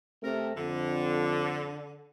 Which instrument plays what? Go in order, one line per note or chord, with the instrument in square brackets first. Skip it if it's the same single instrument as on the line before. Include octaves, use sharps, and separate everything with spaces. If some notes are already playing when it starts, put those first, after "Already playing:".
[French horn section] C3 A3 [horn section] A#4
[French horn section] F2 [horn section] D3